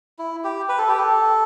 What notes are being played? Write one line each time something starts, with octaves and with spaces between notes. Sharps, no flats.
E4
G4
B4
A4
G4
A4